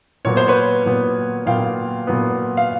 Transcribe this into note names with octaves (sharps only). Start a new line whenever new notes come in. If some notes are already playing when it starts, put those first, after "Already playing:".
A#2 F#3 B3 C#5
C5
B4 C#5
A#2 F#3 B3
A#2 F#3 B3 F5 G5
A#2 F#3 B3
F5